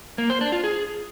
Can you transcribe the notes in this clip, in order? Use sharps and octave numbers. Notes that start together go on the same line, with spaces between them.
A#3
C5
D4
F4
G#4